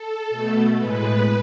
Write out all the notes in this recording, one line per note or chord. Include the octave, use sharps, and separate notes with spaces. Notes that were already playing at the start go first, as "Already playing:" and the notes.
Already playing: A4
B2 A3
A2 G#3 B4